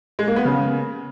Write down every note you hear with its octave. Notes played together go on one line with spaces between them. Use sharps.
G#3
A#3
B3
C#3